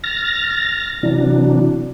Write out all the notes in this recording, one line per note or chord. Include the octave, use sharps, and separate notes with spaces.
F6 A6 A#6
C3 E3 F#3 D4